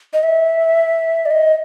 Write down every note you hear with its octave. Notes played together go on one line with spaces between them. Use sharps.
D#5
E5
D5
D#5